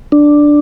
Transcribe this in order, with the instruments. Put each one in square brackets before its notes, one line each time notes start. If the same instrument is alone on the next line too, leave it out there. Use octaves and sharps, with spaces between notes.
[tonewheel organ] D4